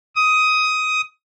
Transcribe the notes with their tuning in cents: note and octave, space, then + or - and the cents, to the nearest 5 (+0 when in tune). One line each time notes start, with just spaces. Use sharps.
D#6 +15